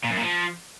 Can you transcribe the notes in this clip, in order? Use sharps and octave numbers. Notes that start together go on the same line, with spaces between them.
A#2
F#2
A#2
F3